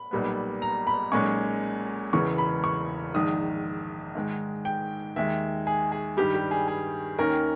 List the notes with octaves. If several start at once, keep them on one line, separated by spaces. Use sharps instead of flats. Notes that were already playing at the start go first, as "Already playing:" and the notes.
Already playing: B5
B1 A#2 G3 B3
A#5
B5
B1 A#2 G#3 C#4 C#6
E1 E2 C#3 E3 C#6
B5
C#6
A#1 G#2 D#3 D#6
G#2 D#3 G#3
G5
D#2 D#3 G#3 E5
G#4
G#4
G2 D#3 G3 G4
G4
G#4
G#4
D#2 D#3 A#3 C#4 A#4